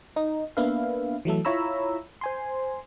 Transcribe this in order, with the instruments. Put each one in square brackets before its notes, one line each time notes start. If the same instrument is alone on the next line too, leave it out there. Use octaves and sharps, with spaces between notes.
[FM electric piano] D#4
A#3 B3 D4 B4 E5 F5
E3 F#3 A3 A4
E4 F4 C#5 A#5 B5 E6
C5 G#5 C6